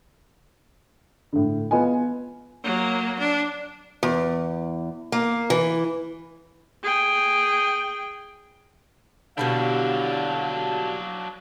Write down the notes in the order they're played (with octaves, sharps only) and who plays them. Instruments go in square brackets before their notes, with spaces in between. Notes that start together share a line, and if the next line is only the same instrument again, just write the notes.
[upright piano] A2 D3
B3 F4 D#5 G#5
[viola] F#3 A#3
D4
[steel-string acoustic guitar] E2
A#3
E3
[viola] G#4 G5
[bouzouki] B2 G3 E4 [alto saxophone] D3 [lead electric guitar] F#3 D4 [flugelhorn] F5